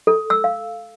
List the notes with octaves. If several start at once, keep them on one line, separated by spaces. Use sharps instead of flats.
A4
E6
F5